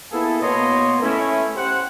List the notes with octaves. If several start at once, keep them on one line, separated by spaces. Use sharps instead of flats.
A#3 B3 E4 G#4 A4
B2 A#3 B3 C#5 D#5 C6
A3 C#4 E4
G4 C5 F#5